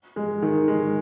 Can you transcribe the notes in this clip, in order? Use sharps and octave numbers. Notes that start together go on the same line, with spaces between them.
G#3
D#3
G#3